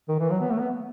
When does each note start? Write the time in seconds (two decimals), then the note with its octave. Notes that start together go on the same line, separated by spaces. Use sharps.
0.09 D#3
0.19 E3
0.30 F#3
0.40 B3
0.51 A3
0.60 B3